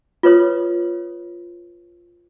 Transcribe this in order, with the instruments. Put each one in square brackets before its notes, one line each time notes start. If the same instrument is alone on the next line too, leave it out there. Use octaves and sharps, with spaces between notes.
[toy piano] F4 B4 C#5 D#6